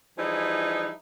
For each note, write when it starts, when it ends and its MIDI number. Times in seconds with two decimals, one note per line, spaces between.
0.18 0.90 52
0.18 0.90 53
0.18 0.90 55
0.18 0.90 63
0.18 0.90 64
0.18 0.90 68